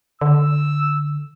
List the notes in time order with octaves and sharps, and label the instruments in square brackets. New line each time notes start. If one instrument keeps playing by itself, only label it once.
[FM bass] D3 [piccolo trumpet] E6